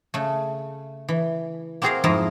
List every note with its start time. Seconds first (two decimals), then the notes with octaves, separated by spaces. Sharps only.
0.14 C#3 A3
1.09 E3
1.82 A#3 C4 F#4 G#4 A#4 F5
2.04 F2 G#2 E4 A#4 D#5 A#5